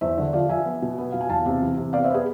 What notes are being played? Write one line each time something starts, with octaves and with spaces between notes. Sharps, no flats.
E2 C5 E5
D3
F3 D5 F5
F3 E5 G#5
B3
B2
B3
B2 F5
G#5
E2 F5 A5
C3
E3
C3
B3 D5 F5
C5 E5
B3 G#4 B4